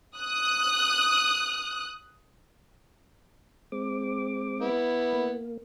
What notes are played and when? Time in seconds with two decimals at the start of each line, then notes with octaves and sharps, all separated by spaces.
0.17 D#6 F#6
3.72 G#3 C4 D6
4.61 B3 E4
5.13 A#3